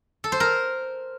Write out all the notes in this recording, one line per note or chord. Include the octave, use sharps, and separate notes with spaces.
A4
C5
A#4